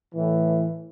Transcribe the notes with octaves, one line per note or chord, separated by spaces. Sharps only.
A2 E3